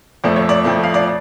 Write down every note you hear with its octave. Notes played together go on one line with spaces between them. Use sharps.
F2 F3 A3 D5
C#5
D5
F2 F3 A3
F5
D5